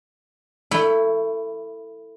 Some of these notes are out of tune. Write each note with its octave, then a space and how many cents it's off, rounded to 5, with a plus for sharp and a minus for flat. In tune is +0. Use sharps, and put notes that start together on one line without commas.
A3 +25 E4 +0